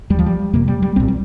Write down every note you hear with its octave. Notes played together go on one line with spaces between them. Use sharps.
D#2 G3
F3
G3
F2 C3 A#3
G3
G3
C2 A#2 C4
G3